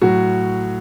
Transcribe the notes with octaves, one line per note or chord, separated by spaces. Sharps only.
A2 F#3 F#4